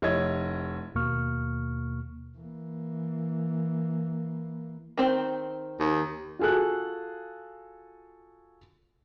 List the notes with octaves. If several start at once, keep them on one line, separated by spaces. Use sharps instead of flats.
F1 E4 C#5 D#5 G#6
D#2 B2 A#3 C#6 F6
E3 A#3
D#3 C4 C5
D#2
F4 F#4 G#4 A4 F#6